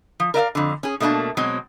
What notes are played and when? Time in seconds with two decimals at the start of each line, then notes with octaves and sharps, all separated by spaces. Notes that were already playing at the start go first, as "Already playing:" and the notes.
0.20 F3
0.34 A#4 D5 E5 F5
0.55 F2 D3
0.83 C#4 G#4
1.00 B2 A3 A#3 D4 A5
1.37 B2 F#3 G#3 C4